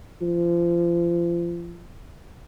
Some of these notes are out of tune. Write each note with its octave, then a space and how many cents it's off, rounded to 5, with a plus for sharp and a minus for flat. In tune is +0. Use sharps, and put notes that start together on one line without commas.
F3 -30